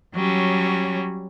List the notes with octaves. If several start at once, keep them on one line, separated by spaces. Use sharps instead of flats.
F#3 G3 C#4